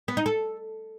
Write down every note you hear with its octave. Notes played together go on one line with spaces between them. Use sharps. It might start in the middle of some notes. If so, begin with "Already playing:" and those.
B3
D#4
A4